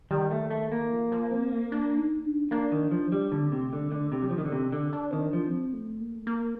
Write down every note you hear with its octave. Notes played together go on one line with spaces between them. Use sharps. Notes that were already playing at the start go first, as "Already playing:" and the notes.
D#3 G3
A3
A3
A#3
F3
F3
C4
D4
D#4
D4
A#3 D4
D#3
F3
G3
D3 A#3
C4
C3 A#3
A3
D3
G3
A3
D3
C3 D4
G3
F3
D#3 D#4
D3
C3
C4
D4
D3
D4
D#3 C4
D4
F3
C4
A3
A#3
A3
A#3